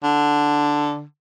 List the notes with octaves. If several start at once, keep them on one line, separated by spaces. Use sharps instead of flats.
D3